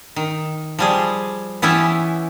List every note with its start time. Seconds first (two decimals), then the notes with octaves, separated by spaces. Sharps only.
0.16 D#3
0.79 F3 G3 G#4
1.62 E3 B3 C#4 E4 G4 E5